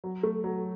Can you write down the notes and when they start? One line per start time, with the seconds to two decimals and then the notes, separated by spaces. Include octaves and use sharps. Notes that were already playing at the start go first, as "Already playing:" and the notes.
0.04 F#3
0.23 A3
0.44 F#3